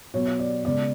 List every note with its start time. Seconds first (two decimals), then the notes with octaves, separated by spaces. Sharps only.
0.14 B2 F#3 B3 C#5
0.39 D5
0.65 C#3 G#3 B3 D5